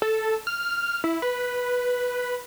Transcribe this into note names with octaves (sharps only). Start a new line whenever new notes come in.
A4
F6
E4
B4